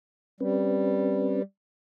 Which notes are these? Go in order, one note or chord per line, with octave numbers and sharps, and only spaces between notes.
G3 C4 C#4 B4